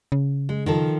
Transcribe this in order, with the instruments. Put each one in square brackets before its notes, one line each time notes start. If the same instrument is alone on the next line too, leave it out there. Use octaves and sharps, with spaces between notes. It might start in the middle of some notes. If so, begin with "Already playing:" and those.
[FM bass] C#3
[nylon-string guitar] G#3
D#3 F3 A4